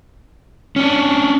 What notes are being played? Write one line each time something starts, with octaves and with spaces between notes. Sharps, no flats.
C#4 D4